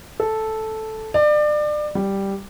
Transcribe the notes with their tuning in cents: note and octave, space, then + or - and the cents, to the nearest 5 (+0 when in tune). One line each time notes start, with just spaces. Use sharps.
A4 -5
D5 +30
G3 +0